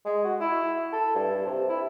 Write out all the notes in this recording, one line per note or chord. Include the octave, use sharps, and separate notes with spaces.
G#3
F#4
E4
A4
G2
C3
E4